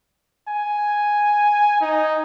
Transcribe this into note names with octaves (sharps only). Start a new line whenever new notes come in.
G#5
D#4